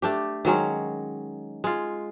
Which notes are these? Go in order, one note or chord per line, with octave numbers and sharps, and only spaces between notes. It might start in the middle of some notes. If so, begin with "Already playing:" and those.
A3 D4 G4
D#3 F#3 G#3 C#4
G#3 F4